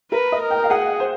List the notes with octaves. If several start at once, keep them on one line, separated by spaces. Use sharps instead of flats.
A#4 B4
D#5
A#4
G5
F5
G#4 F#5
C5